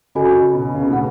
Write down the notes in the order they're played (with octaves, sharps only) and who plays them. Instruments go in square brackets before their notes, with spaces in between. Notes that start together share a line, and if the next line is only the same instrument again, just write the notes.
[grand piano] C#3 [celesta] F#4 A4 D#5 G#5 B5
[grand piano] B2
C#3
B2
[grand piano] A2 [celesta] G#4 B4 F#5 B5